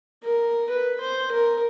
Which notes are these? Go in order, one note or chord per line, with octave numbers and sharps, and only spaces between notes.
A#4
B4
C5
A#4